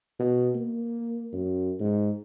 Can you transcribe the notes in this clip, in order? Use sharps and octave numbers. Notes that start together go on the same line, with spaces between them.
B2
A#3
F#2
G#2